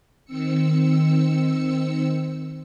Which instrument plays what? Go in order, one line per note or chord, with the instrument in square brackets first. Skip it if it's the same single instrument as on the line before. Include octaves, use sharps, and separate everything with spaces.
[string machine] D#3 C4 E6 C#7